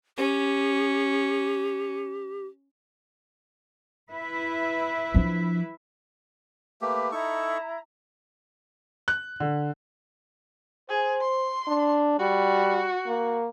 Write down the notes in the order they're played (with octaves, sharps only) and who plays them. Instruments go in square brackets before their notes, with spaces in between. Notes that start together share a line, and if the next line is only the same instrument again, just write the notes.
[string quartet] C#4 [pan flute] G4
[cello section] E4 B4 E5
[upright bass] F3 D4
[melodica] A3 A#3 G4 [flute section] B4
[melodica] D#4 A4 C#6 [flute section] E4 A#5
[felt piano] F#6
D3
[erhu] G#4 [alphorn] C5
[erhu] C6
[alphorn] D4
[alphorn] G3 [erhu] F#4
[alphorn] A#3